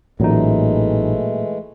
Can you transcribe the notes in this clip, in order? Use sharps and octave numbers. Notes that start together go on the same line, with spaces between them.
A1 A#2 E3 F#3 G#3 A3 D#4